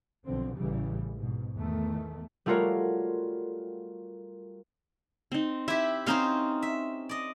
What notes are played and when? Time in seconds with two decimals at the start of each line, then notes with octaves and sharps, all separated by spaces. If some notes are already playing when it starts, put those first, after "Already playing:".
0.24 B1 B2 D3 F3 C4
0.55 A1 A2 C#3 E3 G3
1.15 G#2 B2
1.55 E2 D#3 A3
2.46 G3 A3 F4 F#4 A#4 C#5
5.32 C4 D#4
5.68 E4 G4 E5
6.06 C4 C#4 D#4 C5 F5 D6
6.62 E5
7.09 D5 D#5